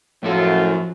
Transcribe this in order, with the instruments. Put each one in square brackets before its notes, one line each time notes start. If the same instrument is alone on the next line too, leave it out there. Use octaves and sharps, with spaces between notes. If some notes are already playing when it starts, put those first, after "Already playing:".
[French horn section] F#2 [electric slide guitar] A2 E4 A4 [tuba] F3 [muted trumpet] F4